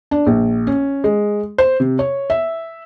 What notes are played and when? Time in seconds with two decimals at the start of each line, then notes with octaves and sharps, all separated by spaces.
0.11 D4
0.26 A#1
0.67 C#4
1.04 G#3
1.58 C5
1.80 C3
1.99 C#5
2.30 E5